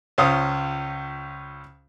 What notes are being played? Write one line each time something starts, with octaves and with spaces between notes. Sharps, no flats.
C#2 C#4 F4 C5 F5 D#6